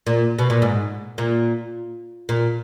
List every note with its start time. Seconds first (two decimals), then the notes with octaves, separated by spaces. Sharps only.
0.07 A#2
0.39 B2
0.50 A#2
0.62 G#2
1.18 A#2
2.29 A#2